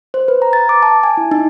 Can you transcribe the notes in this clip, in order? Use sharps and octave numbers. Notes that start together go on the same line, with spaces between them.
C5
B4
A#5
A6
D6
A5
G#5
E4
D#4